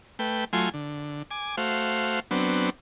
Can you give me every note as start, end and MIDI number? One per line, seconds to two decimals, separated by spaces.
0.19 0.44 57
0.19 0.44 71
0.19 0.44 79
0.53 0.69 54
0.53 0.69 57
0.53 0.69 65
0.53 0.69 80
0.53 0.69 84
0.74 1.23 50
1.31 1.56 80
1.31 1.56 86
1.57 2.20 57
1.57 2.20 66
1.57 2.20 72
1.57 2.20 77
2.31 2.70 54
2.31 2.70 59
2.31 2.70 60
2.31 2.70 62